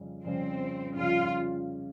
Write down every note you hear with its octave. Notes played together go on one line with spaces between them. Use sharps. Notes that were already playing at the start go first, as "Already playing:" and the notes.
Already playing: F2 C#3 G3 C#4
F2 C#3 G3 C4 C#4
F2 C#3 G3 C#4 F4